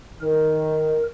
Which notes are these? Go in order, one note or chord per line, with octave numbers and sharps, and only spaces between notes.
D#3 A#4